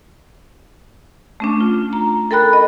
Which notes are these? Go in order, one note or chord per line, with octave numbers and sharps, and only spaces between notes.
A3 C#4 D4
F4
A#5
A4 A#4 G5 B5 F#6
D#5